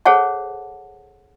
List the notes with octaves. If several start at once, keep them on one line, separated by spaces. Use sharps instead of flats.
G#4 A4 C5 C#5 F#5 A5